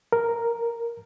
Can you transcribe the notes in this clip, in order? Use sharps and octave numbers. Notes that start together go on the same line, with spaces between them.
A#4